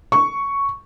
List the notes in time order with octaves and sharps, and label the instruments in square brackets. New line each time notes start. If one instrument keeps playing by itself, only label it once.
[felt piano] C#6